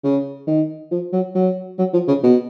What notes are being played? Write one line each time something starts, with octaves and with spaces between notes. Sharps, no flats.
C#3
D#3
F3
F#3
F#3
F#3
F3
C#3
B2